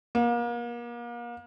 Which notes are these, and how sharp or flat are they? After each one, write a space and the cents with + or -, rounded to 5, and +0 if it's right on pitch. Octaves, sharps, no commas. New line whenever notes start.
A#3 +35